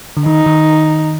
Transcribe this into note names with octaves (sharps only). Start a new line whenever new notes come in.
D3
D#3 D#4
D#3